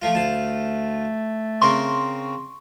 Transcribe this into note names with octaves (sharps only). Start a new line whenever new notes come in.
F3 A3 F4
D2 A3 F4 A5
C#3 C4 A#4 C6 C#6